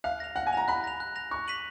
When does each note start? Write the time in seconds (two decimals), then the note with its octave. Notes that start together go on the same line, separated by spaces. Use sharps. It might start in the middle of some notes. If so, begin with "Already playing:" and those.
0.04 F5 F#6
0.20 A#6 F7
0.36 F#5 F#6
0.47 G#5
0.53 A#5 A#6 F7
0.68 B5 F#6
0.84 A#6 F7
1.00 F#6
1.16 A#6 F7
1.31 C#6 F#6
1.48 B6 D#7 F#7